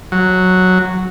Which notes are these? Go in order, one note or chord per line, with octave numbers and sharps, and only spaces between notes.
F#3